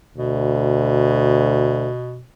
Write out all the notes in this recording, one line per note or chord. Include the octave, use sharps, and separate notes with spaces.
D2 B2